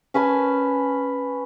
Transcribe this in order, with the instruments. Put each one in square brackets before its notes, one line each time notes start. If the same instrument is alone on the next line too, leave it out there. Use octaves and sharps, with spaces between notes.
[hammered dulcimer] C#4 B4 G#5 A5